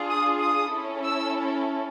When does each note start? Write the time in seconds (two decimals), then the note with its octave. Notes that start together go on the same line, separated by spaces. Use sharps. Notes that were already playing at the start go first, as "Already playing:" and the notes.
Already playing: D4 F4 G#4
0.09 D#6
0.40 D#6
0.72 C#4 E4 A4
1.04 E6